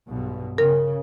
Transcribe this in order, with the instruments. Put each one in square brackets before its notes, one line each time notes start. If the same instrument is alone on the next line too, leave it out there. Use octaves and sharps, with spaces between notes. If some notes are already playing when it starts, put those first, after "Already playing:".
[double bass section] B1 G2 B2
[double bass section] C#3 [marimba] A#4